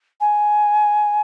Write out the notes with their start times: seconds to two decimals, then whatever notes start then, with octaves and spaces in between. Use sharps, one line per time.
0.20 G#5